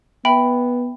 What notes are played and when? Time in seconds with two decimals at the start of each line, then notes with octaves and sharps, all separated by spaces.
0.25 B3 E5 G5 B5